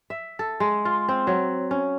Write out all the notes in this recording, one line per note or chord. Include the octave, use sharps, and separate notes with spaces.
E5
A4
G#3
F4
C4
F#3
C#4